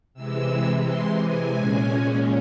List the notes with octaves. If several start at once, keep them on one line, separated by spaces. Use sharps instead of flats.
C3 E3 G#3 E6
C6
G#5
A#2 G#3 C#4